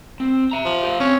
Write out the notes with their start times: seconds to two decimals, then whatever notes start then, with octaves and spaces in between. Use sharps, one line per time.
0.20 C4
0.51 E5 A#5
0.65 F3
0.83 G4 F5
1.00 C4 C#4